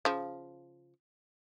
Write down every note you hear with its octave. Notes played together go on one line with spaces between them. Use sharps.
C#3 F3